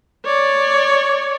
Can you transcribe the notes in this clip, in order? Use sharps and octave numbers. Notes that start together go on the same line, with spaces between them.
C#5 D5